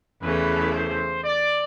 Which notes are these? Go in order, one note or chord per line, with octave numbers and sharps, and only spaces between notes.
E2 C#3 E3 A3 B4
C5
D5